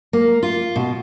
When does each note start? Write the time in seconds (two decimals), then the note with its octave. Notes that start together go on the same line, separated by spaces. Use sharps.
0.13 A#3
0.43 F4
0.76 B2